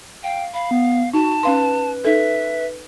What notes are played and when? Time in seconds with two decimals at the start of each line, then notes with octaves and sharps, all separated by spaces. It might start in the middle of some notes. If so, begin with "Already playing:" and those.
0.23 F5 G5
0.54 F5 B5
0.71 B3
1.14 D#4 F#4 A5
1.43 C#4 B4 F5 C6
2.05 D#4 A4 E5